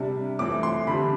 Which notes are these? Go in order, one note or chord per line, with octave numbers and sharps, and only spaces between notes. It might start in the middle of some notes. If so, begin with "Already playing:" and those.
Already playing: C3 G3 D4
E3 A3 C4 D6
C6
D3 G3 C4 B5